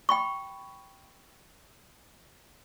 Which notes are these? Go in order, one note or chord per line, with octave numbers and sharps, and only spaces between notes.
G5 B5 C#6